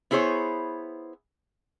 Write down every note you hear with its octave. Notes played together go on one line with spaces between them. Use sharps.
B3 E4 G#4 C5 C#5